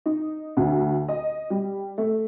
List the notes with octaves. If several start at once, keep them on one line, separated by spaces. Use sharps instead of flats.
D#4
D2
D#5
G3
A3